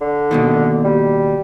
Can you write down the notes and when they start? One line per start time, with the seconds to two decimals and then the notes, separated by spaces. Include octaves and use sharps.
0.01 D3
0.31 D#2 B2 D#3
0.84 G3